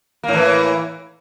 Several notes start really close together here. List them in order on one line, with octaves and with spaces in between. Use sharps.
A#3 A2 E3